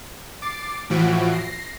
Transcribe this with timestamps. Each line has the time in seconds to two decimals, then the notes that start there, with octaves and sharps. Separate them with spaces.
0.42 D6 A6 C7
0.90 A2 E3 F3 F#4 D7
1.32 A#6 C7